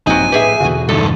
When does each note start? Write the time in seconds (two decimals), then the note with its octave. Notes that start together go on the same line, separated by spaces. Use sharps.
0.07 A#1 G2 F#3 C4 D#4 G#5
0.32 A2 B3 G4 G#4 E5
0.60 E2 B2 D3 F#4
0.89 G2 D#3 A4